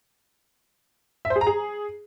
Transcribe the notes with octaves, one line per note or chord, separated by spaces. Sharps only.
E5
C5
G#4
A#5
G#4